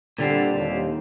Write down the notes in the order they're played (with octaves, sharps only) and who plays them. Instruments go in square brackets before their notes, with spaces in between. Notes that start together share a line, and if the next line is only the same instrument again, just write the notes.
[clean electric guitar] A#2 G3 C4 [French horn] D3
[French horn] D#2